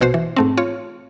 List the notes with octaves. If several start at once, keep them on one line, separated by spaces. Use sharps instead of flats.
A#1 B2 F#4 C5
E3
G#2 A3 C4
F4 C#5